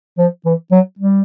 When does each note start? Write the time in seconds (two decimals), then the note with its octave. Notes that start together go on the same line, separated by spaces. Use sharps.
0.18 F3
0.46 E3
0.72 F#3
0.99 G3